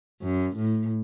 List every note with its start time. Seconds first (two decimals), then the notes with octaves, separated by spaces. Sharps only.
0.21 F#2
0.56 A2